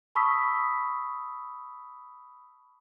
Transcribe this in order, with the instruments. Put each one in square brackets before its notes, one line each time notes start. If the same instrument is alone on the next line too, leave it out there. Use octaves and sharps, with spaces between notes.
[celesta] A5 B5 C#6 D#6 E6 B6